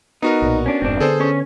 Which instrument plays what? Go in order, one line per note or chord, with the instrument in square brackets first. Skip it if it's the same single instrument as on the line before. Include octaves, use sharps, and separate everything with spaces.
[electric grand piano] B3 F#4 A#4 [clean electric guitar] D#4
[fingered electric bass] B1 A#2
[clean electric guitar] C#4 D4
[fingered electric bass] F1 G#2 [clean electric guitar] C4 D4
[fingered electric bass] D3 B3 [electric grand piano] G#4 A4 C5
[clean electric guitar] C#4 C#5